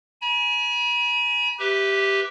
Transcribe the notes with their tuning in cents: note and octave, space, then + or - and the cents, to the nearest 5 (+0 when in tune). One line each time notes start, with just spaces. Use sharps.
G#5 +20 B5 -45
G4 +0 B4 +5 E5 +0